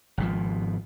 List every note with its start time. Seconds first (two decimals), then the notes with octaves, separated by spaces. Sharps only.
0.18 G#1 B2 F3